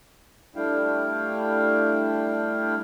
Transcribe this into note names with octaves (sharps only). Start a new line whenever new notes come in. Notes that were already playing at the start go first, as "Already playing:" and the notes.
G3 A3 D4 E4 F5 G5